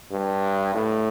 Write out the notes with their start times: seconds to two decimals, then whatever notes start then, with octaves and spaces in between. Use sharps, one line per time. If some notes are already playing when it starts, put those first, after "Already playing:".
0.11 G2
0.75 A2